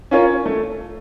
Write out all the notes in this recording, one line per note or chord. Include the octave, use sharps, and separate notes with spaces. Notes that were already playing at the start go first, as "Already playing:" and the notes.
C#4 F4 A#4 C#5
A3